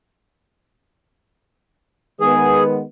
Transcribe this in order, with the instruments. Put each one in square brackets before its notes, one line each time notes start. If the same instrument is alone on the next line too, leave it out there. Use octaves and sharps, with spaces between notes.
[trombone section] D#3 G#3 B3 [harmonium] G#4